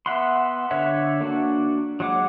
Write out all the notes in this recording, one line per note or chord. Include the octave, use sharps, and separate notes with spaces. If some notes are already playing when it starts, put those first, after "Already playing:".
B3 E5 F#5 C6
D3 C#5 E5 F#5
A#3 D4 F#4
F#3 G#3 F#5 D6